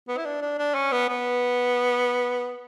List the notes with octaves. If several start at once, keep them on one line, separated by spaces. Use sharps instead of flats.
B3
E4
D4
D4
D4
C#4
B3
B3